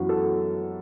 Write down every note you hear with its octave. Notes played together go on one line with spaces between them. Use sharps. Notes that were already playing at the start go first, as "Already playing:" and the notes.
Already playing: F#2 E3 B3 F#4
A4